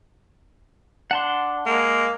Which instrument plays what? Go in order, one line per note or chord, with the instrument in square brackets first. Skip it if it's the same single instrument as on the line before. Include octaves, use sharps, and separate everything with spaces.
[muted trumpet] D4 [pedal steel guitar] F#5 A5 C6
[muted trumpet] G#3 [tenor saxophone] A#3